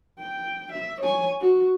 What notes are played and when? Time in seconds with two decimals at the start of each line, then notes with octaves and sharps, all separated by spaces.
0.19 G5
0.72 E5
1.00 C#5 G#5
1.41 F#4